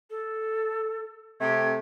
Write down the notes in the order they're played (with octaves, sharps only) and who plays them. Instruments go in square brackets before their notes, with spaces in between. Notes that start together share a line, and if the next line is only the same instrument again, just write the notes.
[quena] A4
[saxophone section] C3 A3 G4 [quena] G#6